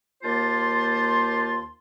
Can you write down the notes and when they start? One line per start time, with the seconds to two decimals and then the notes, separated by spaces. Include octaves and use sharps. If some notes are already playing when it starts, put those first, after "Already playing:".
0.23 D#2 A#3 F4 C5 A5 C6